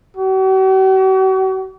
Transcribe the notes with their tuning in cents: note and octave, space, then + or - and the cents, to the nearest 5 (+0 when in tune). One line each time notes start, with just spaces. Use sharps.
F#4 +45